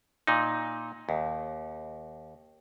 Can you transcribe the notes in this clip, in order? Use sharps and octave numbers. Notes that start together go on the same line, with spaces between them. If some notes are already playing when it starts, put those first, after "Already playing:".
A#2 D#4
D#2